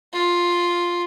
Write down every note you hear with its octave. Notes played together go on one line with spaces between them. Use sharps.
F4